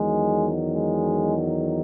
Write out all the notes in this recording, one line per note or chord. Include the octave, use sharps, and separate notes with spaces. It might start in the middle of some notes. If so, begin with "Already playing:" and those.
Already playing: E2 D#3 F#3 G#3
G#3